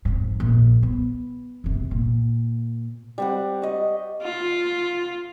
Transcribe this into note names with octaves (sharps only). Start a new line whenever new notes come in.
F2 G#2
A#1
B3
F#1 C3
A#2
G3 C4 F#5
D#5 C#6
F4